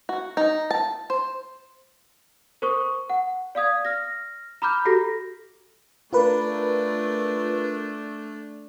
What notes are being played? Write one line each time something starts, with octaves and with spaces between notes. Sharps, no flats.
F#4
D#4
A5
C5
A#4 C5 C#6 D#6
F#5
D5 F5 D#6 G#6
F6 A#6
A#5 B5 D6 F6 G6
F#4 G4 A4 A#6
A3 D4 F4 A#4 B4